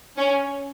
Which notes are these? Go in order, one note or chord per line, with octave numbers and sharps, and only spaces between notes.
C#4